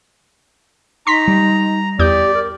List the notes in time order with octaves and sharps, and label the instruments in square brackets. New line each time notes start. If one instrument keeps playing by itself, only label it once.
[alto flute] D#4 [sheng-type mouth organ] A#5 [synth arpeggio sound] C6 C#6 B6
[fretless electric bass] G3
[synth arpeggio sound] E2 D#6 G6 [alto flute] G4 [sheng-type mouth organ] D5
[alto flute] A#4